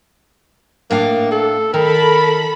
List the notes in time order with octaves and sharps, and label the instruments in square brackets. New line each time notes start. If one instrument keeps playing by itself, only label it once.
[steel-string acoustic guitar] A2 D4 F5 [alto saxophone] A#3
[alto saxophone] A4
[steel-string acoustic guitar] D#3 [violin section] A4 B5 [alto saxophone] A#4